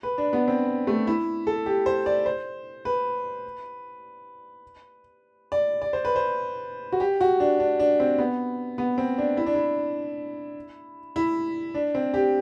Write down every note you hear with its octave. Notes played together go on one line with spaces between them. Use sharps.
B4
D4
B3
C4
A3
E4
A4
G4
C5
D5
C5
B4
D5
D5
C5
B4
C5
F#4
G4
F#4
D4
D4
D4
C4
B3
B3
C4
D4
E4
D4
E4
E4
D4
C4
G4